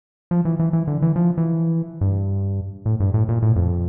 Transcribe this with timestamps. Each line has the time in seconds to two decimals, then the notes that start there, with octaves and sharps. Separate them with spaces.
0.31 F3
0.45 E3
0.59 E3
0.73 E3
0.87 D3
1.02 E3
1.16 F3
1.38 E3
2.01 G2
2.86 A2
3.00 G2
3.14 A2
3.29 A#2
3.42 A2
3.56 F2